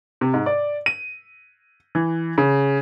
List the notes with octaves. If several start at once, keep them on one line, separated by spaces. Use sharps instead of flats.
C3
G#2
D5
D#7
E3
C#3